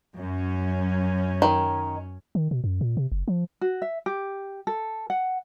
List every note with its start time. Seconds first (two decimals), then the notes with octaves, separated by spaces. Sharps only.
0.15 F#2 C#4
1.42 D#3
2.35 D#3
2.51 B2
2.64 F#2
2.81 A#2
2.97 C3
3.12 F#1
3.28 F3
3.61 F#4
3.82 E5
4.06 G4
4.67 A4
5.10 F#5